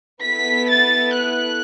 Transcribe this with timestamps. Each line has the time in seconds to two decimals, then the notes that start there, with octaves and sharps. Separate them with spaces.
0.23 B3 E4 A4 B6
0.70 A6
1.17 F#6